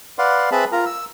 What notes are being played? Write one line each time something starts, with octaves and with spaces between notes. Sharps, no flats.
B4 D5 F5 F#5 C6
C4 G#4 B4 E5 A5 B5
F4 A#4 A#5
E6